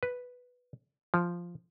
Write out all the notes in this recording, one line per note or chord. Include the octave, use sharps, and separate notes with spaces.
B4
F3